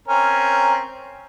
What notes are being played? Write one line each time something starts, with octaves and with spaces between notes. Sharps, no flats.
C4 C#4 A#4